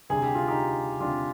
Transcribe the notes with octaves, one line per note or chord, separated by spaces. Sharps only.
D2 C3 G3 G#4
G4
F4
D#4 G4
D2 C3 G3 D4 F4